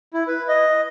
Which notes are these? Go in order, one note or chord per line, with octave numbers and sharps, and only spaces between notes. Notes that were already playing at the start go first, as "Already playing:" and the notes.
E4
B4
D#5